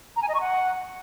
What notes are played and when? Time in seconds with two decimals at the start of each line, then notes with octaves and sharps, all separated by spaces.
0.16 A#5
0.22 G#5
0.28 D#5
0.35 C#6
0.41 F#5